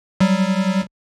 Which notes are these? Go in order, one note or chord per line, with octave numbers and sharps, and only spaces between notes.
F#3 G3